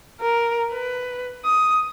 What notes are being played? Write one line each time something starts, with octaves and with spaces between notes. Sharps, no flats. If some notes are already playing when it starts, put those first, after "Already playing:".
A#4
B4
D#6